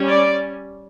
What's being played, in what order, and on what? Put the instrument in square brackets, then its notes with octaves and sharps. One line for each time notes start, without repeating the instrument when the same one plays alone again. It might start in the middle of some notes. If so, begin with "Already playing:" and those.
Already playing: [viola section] G3 C#4
D5